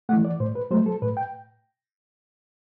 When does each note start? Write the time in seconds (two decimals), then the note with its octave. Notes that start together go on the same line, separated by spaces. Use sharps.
0.09 A3 F#5
0.13 E3
0.25 D5
0.40 A2 C5
0.55 B4
0.71 F#3 A3 C5
0.86 A4
1.02 A2 B4
1.17 G5